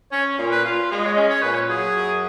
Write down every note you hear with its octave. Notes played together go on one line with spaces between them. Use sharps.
C#4 C#5
A#2
B4
F4
G#3
D#5
C#5
D#5
C#4
C#5
A#2 B4
C#5
F#3 G#4
F#2